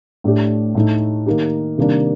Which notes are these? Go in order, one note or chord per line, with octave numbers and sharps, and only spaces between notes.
A2 A3 D4 G4
A2 A3 D#4
D#3 A#3 D#4 G4
C3 D#3 G3 A#3 D4